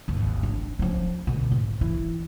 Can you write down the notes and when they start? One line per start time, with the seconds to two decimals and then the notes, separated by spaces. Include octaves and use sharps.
0.08 G#1 D#2
0.43 D4
0.79 F3 C#4
1.27 B2 D3
1.52 G#2
1.81 E3